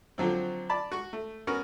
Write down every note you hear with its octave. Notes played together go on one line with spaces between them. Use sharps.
D3 F3 F#3 C4
D5 A5 B5
F#4 C#6
A3
B3 C#4 F#4 A#4